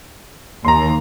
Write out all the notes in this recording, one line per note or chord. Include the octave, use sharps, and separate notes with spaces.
D#2 A#5 C6